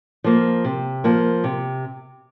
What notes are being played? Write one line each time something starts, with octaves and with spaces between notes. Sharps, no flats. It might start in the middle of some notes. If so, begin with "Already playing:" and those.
F3 A#3
C3
F3 A#3
C3